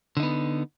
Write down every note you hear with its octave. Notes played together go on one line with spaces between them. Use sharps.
D3 B3 D#4